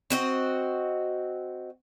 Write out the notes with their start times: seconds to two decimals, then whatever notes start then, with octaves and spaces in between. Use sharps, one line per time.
0.10 C4 F#4 D#5